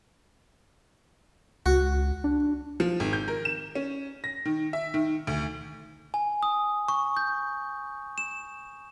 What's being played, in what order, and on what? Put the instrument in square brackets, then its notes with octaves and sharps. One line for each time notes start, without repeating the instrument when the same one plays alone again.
[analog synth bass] C#2 [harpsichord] F#4
[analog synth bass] D4
[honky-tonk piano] F3
G#1
G6
A#4
E7
C#4
A#6
D#3
E5
D#3
D2
[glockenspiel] G#5
D#6
C#6
G6
E7